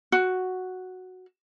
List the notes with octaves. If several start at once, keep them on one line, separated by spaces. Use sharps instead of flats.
F#4